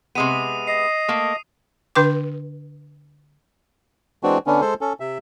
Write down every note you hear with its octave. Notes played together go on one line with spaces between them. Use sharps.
C3 G#3 B3 D#6 D#7
D#5 C7
A3 A#3
D3 D4 B4 G5 D6
E3 G#3 C4 D4 F#4
D3 B3 C#4 D4
G#3 A4 C5
C#4 A4
C3 E5